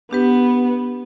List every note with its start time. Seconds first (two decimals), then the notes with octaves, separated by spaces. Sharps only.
0.11 B3 D4 G4 B4